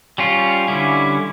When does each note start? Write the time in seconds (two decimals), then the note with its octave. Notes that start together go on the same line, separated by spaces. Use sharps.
0.18 G3 C#4 F4
0.68 D3 G3 C#4 E4